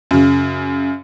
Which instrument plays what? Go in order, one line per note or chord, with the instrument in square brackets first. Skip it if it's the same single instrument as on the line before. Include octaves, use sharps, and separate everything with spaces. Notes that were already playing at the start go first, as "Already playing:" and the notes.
[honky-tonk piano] F#2 C#3